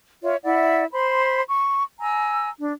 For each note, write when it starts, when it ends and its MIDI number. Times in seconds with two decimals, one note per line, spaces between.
0.22 0.35 65
0.22 0.35 73
0.22 0.35 76
0.43 0.83 64
0.43 0.83 74
0.43 0.83 76
0.43 0.83 78
0.91 1.41 72
0.91 1.41 83
0.91 1.41 84
1.47 1.84 85
2.00 2.49 80
2.00 2.49 82
2.00 2.49 88
2.59 2.72 62